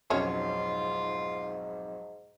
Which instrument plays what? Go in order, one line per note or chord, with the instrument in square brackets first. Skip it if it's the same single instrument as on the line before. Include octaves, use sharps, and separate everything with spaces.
[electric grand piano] B1 F2 [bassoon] G#2 [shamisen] C#4 F#4 C#5 [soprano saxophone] F4